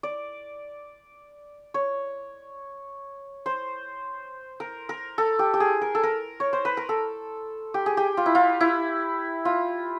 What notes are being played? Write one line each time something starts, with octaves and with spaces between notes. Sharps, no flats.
D5
C#5
C5
A#4
A#4
A4
G4
G4
G#4
A#4
A4
A#4
C#5
C5
B4
A#4
A4
G4
G#4
G4
F4
E4
F4
E4
F4